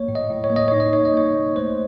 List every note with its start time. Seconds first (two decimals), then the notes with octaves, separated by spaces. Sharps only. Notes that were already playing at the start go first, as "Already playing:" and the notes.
Already playing: A#3 C#5
0.08 A2
0.15 D#5
0.30 A2
0.44 C#5
0.50 A#3
0.56 D#5
0.68 D#4 C#5
0.80 D#5
0.93 D#4 C#5
1.05 D#5
1.13 A#3 C#5
1.35 A#3
1.56 A3 C5